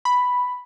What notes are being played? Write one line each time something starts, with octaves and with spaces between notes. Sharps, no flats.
B5